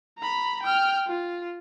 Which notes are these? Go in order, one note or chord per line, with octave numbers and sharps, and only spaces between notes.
A#5 B5
G5 F6
F4